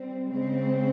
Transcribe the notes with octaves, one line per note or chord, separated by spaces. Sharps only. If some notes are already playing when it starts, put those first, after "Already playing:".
Already playing: G3 C4
C#3 G#3 C4